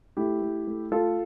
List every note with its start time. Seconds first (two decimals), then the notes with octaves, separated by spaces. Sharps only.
0.17 A3 E4 G4
0.42 A3
0.67 A3
0.92 A3 F4 A4